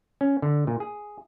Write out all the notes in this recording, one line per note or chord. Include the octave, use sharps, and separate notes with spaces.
C#4
D3
A#2
G#4